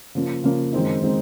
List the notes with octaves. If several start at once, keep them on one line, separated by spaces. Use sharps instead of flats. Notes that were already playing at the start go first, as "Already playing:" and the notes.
C#3 F3 A#3
C#3 F3 A#3
F#2 D#3 G#3 C4 D#4
D#3 G#3 C4 D#4